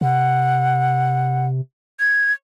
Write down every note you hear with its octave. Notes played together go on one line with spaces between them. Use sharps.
C3 F#5
G#6